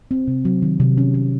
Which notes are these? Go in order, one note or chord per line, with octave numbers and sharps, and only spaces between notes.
C4
C3
F#3
D#3
C3
C#4
C#4